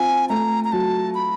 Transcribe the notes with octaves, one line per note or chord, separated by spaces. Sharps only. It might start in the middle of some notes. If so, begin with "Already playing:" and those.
Already playing: C4 F4 G#5
A3 A#5
A#5
F#3 A5
B5